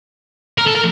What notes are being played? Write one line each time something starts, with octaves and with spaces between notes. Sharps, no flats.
A#4
A4
A#4